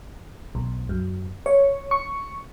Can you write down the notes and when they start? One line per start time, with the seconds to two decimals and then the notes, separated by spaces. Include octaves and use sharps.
0.55 B1
0.89 F#2
1.46 C#5
1.91 C#6